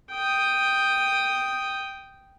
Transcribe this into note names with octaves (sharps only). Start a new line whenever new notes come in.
G5 D#6